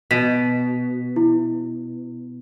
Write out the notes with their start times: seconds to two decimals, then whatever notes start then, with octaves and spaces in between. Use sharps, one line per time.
0.11 B2 B6
1.16 E4